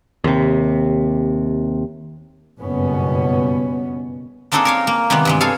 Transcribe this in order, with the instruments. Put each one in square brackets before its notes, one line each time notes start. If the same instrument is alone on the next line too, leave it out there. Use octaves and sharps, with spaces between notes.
[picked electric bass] D#2 C3
[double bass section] F#1 G2 B2 B3 C#4
[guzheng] A#3 C4 D4 D#4 G#4 A4
A#4 C#5 F5
A#3
C3 D#3 G3 G#3 B3
G2 E3 G#3
G#4 A4 C#5 F5